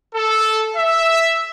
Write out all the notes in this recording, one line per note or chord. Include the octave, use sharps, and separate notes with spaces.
A4
E5